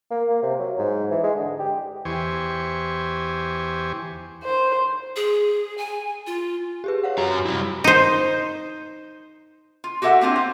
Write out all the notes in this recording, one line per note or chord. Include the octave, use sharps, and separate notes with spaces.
A#3
A#3
C3
F#3
G#2
E3
G#3
D3
G4
E2 E3 G4 C5 G#5 C#6
C5
G#4
G#5
F4
G4 G#4 B4
C#5 F5 F#5
F#2 F#4 G4 A#5
F6
G3 E4
D#4 C5
F4
F#4 G4 A4 E5 F#5
A#3 C4 D4 F4
C5